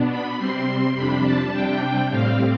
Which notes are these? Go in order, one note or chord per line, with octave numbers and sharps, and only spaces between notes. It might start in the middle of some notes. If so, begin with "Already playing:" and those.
Already playing: B2 B3 D4
B5
C3 G3 C4 C6
F2 C3 G3 D4 B5
A5
C3 G3 D4 G5
A2 G3 C4 F5